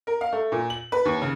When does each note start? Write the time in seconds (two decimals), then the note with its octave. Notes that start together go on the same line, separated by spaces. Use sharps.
0.07 A#4
0.21 F5
0.33 A3
0.52 A#2
0.70 F#7
0.92 B4
1.05 D#2
1.22 C#3